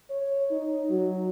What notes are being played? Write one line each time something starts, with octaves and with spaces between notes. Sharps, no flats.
C#5
D#4
F#3